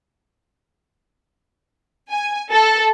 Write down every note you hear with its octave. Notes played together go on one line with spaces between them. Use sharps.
G#5
A4